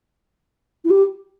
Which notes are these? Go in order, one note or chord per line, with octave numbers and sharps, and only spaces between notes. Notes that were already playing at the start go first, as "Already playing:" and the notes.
E4
G4